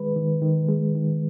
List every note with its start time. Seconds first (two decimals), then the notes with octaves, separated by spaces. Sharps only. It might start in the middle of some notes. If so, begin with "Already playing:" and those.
Already playing: D#3 G#3 B4
0.16 D#3
0.42 D#3
0.68 G#3
0.95 D#3